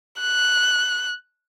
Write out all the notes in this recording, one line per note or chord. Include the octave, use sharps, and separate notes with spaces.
F#6